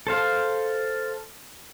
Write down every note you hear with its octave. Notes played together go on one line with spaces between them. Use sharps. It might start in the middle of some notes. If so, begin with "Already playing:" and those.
A4 C5 F5